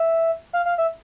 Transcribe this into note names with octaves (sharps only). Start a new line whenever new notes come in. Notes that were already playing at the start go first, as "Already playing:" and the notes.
Already playing: E5
F5
F5
E5